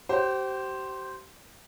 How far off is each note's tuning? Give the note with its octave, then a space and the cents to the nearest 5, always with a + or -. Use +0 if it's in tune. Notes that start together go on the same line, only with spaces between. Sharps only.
G4 -35 C5 +0